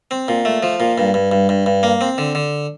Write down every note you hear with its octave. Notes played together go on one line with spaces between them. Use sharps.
C4
A#2
A3
F3
A#2
G2
G2
G2
G2
G2
A#3
C4
D3
D3